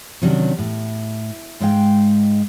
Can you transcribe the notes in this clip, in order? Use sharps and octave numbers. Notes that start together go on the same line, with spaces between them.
C3 D#3 F#3 C#4 D4
A2
G#2 G#3 F5 G5